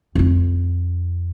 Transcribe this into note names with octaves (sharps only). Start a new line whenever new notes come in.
F2 F4